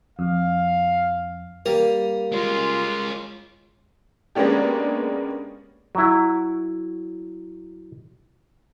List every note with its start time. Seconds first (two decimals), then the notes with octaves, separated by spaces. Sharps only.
0.19 F2 F5
1.66 G3 A#3 A#4
2.32 G#3 C#4 F4
4.35 G#3 A#3 B3 C#4 D4 G4
5.95 F#3 E4